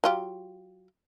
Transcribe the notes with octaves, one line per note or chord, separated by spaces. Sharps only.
F#3 F4 G4